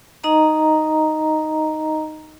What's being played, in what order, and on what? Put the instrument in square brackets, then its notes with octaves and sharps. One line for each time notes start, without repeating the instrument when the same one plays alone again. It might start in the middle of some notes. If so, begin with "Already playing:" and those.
[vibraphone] D#4 D#5 A#5